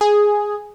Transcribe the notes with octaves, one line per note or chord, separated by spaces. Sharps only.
G#4